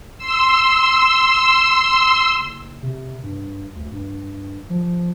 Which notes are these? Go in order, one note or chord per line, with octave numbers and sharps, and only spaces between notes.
C6 E6
F#1
C3
G2
D2
G2
F3